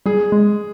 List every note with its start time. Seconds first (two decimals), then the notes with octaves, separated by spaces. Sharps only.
0.06 G3 G#4
0.32 G#3